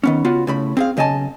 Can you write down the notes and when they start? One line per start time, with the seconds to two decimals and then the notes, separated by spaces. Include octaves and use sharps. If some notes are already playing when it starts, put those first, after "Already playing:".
0.04 D#3 B3 C#4
0.25 C#3 B3 F4 F#4
0.47 A2 C#3 B5
0.77 C4 G#4 F5
0.97 B1 C#3 D#5 G#5 A5